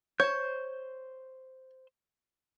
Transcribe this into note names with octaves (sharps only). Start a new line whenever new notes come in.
C5 C#5 G6